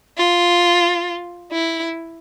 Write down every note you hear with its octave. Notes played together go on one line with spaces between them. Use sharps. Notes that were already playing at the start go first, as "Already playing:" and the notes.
F4
E4